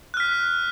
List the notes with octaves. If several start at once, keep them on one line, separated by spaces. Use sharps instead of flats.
F6 F#6 B6